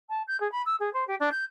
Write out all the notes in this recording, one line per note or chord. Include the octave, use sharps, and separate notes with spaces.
A5
G6
G#4
B5
E6
G#4
C5
G4
D4
G6